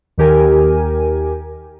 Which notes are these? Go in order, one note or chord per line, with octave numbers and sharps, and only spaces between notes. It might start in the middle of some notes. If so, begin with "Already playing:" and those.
D#2 D#3 G4 A#4 G#5